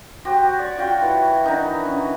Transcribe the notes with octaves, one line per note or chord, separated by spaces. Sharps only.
F#4 G4 C5
C#5 D5
F4 F#4 G5
E3
E3 D4 D#4 A#4
C#4